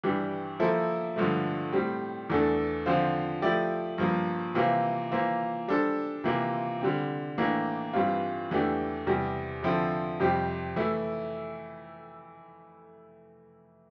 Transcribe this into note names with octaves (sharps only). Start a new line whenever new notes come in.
G2 E3 G3 D4 G4
F3 A#3 E4 A4 C5
G2 D3 F3 A3
A2 G3 C4
E2 E3 A3 D4 A4
D3 F3 C4 F4 C5
F3 A3 E4 G4 D5
G2 F3 A#3
C3 E3 A#3 F4 C5
E3 A#3 F4 C5
G3 D4 A4 C5
C3 E3 A#3 F4
D3 G3 C4
A2 E3 A#3 D4
G2 E3 G3 C4 F4
E2 E3 A3 D4 G4
E2 C3 G3
D3 F3 C4 E4 A4
F2 C3 G3 C4 G4
E3 A3 E4